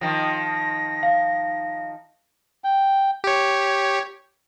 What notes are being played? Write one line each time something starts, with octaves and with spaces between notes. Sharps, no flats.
D#3 F3 A#6
F5
G5
G4 C#5